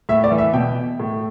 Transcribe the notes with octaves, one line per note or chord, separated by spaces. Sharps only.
A2 E5
D5
E3
E5
B2 G5
A2